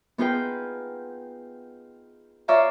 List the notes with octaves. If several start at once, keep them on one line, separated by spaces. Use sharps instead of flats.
B3 D#4 F4 G#4 B4 G5
F4 C#5 D5 E5 F5 A#5